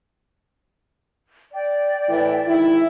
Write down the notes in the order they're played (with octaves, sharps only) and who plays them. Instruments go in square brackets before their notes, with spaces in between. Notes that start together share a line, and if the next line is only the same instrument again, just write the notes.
[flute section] D5 G5
[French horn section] A2 E3 E4
G#2 D#3 E4